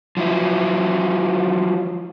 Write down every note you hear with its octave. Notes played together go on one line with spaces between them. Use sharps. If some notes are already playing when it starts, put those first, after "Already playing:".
F3 F#3 E4